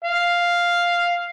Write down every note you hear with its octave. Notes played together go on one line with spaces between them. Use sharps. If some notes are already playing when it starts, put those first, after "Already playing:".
F5